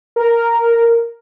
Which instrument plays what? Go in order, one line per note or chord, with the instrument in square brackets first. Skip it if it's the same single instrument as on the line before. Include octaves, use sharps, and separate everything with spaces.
[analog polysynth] A#4